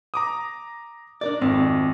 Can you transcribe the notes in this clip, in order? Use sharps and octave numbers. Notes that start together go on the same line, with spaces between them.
A#5 D6 D#6
D4 A#4 D5
G#1 F2 C4